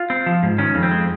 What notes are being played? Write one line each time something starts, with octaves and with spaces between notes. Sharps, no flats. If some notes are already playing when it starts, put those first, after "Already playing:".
Already playing: F4
C4
F3
G#2
D#3 C#4
F2
C4
G#3